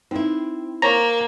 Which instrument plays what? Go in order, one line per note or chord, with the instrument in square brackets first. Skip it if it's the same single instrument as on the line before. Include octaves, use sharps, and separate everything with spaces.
[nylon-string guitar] C4 E4 [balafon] D#4
[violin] A#3 [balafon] C5 C#5 C#6 [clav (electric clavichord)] A#5